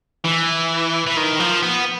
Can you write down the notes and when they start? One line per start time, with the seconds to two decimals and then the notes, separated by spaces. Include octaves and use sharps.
0.24 E3
1.07 E3
1.17 D#3
1.40 F3
1.63 B3